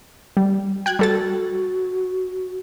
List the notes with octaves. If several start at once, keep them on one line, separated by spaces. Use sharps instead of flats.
G3
F#4 G5 F#6 G#6
G3 F#4 A4 A6